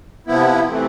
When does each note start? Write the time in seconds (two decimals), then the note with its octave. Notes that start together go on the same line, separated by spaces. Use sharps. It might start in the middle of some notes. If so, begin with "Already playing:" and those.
0.27 C3 F3 B3 E4
0.68 C3 E3 A3 C4